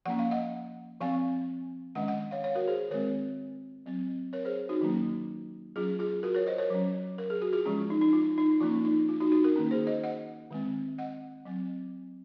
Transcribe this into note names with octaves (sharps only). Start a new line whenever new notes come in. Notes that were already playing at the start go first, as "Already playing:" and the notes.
F3 A#3 C#4 F#5
F5
D#5 F#5
F3 C4 F5 G#5
D#3 G#3 C#4 D#5 F#5
D#5 F#5
C#5 F5
C#5 F5
F#4 A#4
G#4 C5
D#3 G#3 C4 A#4 C#5
F#3 C4
A#4 C#5
G#4 C5
D#4 F#4
D#3 F#3 A#3 C#4
F#3 C#4 F4 G#4
F4 G#4
F#4 A#4
A#4 C#5
C5 D#5
A#4 C#5
F#3 C#4
A#4
G#4
F#4
F4 G#4
F3 G#3 C#4
D#4
D#4
F4
D#4
F3 A#3 C#4 F4
D#4
F4
D#4 F#4
D#4 F#4
F#4 A#4
D#3 A#3 C#4
G#4 C5
C5 D#5
D#5 F#5
D#3 G#3 C4
D#5 F#5
F#3 C4